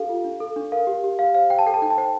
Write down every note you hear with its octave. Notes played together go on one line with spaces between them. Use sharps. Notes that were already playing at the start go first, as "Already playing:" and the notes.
Already playing: D4 G4 A4 F5
F4
D4
A4
D4
A#4 F5
G4
G4
G4 F5
C5 F5
C5 G5
A5
A4 G5
A5
D#4 G5
A5
C5 G5